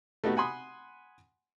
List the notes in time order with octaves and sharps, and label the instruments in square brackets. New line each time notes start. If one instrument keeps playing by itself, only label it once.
[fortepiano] A3 B3 D#4 F#4 G4
F#5 G#5 B5 C6 D#6